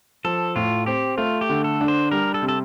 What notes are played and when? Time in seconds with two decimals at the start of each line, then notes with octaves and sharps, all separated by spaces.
0.24 F3 A4
0.56 A2 F4
0.86 C4 G4
1.17 A3 F4
1.41 G4
1.49 D3
1.64 A4
1.81 D4
1.88 C5
2.11 G3 A#4
2.34 A4
2.42 C3
2.49 A4